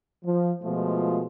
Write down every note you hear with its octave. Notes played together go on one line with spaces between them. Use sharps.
F3
B2 F3 G#3 A3 F4